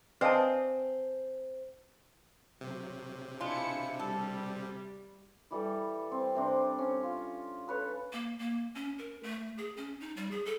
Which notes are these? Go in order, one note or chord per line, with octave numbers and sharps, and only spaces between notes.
C4 B4 D5 D#5 F5 G#5 A5
C3 F#3
G#3 D4 E4 F4 C#7
G3 A4
E3 G3 A4
C4
C3 C4 D4
C#4
F4
A4 B4 C#5
A#3
A#3
C#4
A#4
A3
G#4
C#4
D#4
G3
G#4
A4